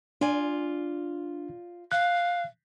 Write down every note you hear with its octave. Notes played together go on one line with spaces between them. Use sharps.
D4 F4 D5 G#5
F5 F#6